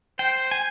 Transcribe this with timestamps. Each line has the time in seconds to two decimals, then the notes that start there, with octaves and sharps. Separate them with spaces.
0.19 C5 G5
0.51 G#5